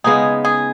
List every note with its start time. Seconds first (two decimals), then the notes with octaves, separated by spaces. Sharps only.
0.04 C#3 G#3 B3 D#4 G#4
0.45 G#4